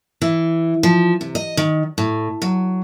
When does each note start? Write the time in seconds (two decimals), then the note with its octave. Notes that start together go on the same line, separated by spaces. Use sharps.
0.22 E3
0.83 F3
1.21 C3
1.35 D#5
1.57 D#3
1.98 A2
2.42 F#3